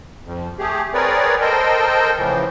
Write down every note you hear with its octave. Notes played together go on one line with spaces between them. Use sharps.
F2
A3 G4 G#4
C4 G#4 A#4 B4 C#5 D5
A4 A#4 C5 D#5 G5
A2 C#3 E3 F3